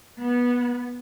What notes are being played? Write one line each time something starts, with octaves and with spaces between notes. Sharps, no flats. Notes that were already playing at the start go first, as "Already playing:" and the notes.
B3